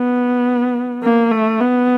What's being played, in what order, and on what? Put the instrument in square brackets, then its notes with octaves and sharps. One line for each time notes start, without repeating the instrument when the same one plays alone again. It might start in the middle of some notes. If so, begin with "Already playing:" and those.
Already playing: [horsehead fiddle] B3
A#3
A3
B3